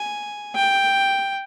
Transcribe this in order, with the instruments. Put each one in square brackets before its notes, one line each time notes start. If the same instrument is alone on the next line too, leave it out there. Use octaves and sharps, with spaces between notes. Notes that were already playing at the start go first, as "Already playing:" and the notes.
Already playing: [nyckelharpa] G#5
G5